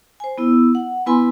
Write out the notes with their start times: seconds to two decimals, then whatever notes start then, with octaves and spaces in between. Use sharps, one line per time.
0.20 C5 G#5
0.38 B3 E4 E6
0.75 F#5
1.06 B3 E4 B4 G#5 B5 C6